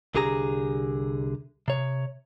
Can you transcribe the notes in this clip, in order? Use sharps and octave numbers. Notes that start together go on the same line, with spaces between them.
C2 D3 G4 G#4 A#5
C3 C#5